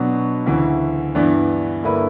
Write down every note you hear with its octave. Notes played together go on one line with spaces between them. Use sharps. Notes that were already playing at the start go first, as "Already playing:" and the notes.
Already playing: B2 F#3 B3 D4
D2 C#3 E3
G2 E3 B3 D4
G2 D3 A#3 E4 B4